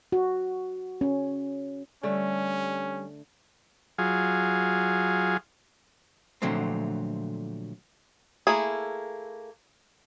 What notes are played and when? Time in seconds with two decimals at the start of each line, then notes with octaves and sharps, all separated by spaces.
0.12 F#4
1.01 C#4
2.03 D3 G3 A3 C#4
3.98 F#3 F4 G#4
6.42 A#2 D3 F3 F#3 A3 C4
8.47 A3 A#3 E4 G#4